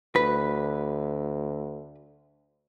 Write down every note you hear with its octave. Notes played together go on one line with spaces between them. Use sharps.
D2 B4